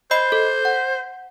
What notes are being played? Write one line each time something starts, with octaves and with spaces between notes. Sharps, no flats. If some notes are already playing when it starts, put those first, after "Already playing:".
C5 D#5 B5 C7
A4
F#5